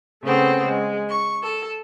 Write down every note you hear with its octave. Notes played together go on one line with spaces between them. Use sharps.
C#3 A3 B3 C4
G#3
C#6
A4